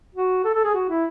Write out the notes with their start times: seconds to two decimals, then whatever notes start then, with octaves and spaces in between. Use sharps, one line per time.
0.15 F#4
0.44 A4
0.54 A4
0.64 G#4
0.74 F#4
0.89 E4